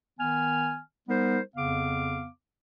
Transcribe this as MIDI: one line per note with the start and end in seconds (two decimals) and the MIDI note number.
0.19 0.80 51
0.19 0.80 59
0.19 0.80 80
0.19 0.80 89
1.09 1.39 55
1.09 1.39 59
1.09 1.39 63
1.09 1.39 70
1.09 1.39 72
1.56 2.27 41
1.56 2.27 49
1.56 2.27 59
1.56 2.27 77
1.56 2.27 86